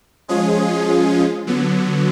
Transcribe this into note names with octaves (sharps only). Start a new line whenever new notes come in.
F3 G#3 C#4 F4 G#4
D3 F#3 B3